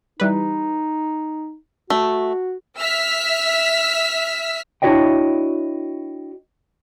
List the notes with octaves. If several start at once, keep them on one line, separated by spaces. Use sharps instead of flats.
E3 G3 D#4 B4
A3 F#4
E5 E6 F6 B6
D4 E4 F#4 C#5 D#5 G5